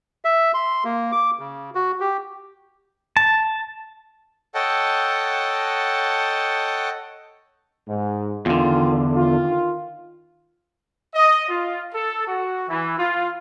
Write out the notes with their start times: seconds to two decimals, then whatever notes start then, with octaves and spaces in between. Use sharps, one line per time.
0.25 E5
0.54 C6
0.85 A#3
1.12 D6
1.39 C#3
1.75 F#4
2.00 G4
3.17 A5
4.55 A4 C#5 D#5 F#5 G5 A5
7.88 G#2
8.46 E2 D3 D#3 F4
9.16 D#3 F4
11.15 D#5
11.49 F4
11.94 A4
12.27 F#4
12.69 E3
12.98 F4